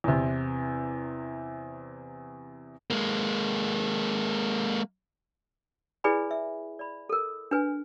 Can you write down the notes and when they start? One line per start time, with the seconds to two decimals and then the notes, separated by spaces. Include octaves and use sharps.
0.04 E2 C3
2.90 G#3 A#3
6.04 E4 G#4 B4 D5 G#5 B5
6.31 E5
6.79 D5 B5
7.09 A4 A#4
7.51 D4 B4 G#5